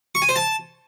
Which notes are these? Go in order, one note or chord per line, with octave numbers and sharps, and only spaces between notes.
C#6
G#5
C5
A5